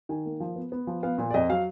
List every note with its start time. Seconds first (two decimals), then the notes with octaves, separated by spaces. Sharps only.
0.09 D#3 G#5
0.26 A#3
0.40 F3
0.56 B3
0.72 B3
0.87 F3
1.03 B3 F5
1.18 A#2
1.30 D5
1.34 F2 D#5
1.49 F#3 F5